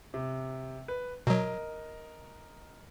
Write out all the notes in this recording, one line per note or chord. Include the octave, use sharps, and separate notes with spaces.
C3
B4
B2 F#3 A#4 D#5